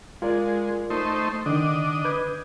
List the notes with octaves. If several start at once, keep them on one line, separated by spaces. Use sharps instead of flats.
G#3 F4 A#4 D5
A3 D#4 C5
D3 D#3 D4 D#5
B4 G6 G#6